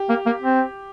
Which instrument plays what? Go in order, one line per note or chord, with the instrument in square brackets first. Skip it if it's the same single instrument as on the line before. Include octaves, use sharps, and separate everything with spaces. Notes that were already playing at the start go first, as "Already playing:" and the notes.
Already playing: [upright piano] G4
[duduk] A#3
A#3
C4